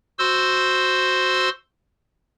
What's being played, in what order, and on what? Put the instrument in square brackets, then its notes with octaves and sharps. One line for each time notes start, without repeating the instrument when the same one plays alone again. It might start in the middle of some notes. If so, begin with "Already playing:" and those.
[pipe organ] F#4 C5 C6 E6